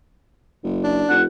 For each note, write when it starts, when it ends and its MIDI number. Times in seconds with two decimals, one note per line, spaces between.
0.64 1.04 30
0.84 1.16 62
1.10 1.25 29
1.10 1.23 78